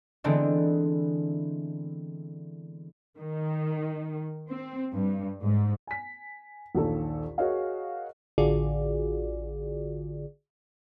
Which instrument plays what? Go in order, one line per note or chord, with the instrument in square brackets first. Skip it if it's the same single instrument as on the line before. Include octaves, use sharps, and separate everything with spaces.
[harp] D3 E3 G#3 B3 C4 D4
[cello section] D#3
C4
G2
G#2
[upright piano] G#5 B6
A#1 D#2 A4
F#4 G#4 A#4 C#5 D#5 F5
[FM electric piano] A1 D3 F4 F#4 G#4 D5